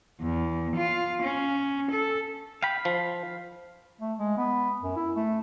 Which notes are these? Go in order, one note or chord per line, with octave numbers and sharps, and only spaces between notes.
E2
F4
C#4
A4
F5 G5 B5
F3
A3
G#3
B3
F#2
E4
A3